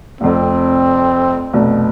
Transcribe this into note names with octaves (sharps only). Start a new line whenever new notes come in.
F1 F2 C4
F1 B2